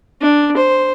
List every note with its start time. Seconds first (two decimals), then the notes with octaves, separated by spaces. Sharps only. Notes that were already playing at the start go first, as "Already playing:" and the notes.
0.21 D4
0.57 C5